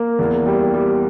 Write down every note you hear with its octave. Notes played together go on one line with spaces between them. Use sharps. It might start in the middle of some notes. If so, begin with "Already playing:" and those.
Already playing: A#3
E2
G3
G3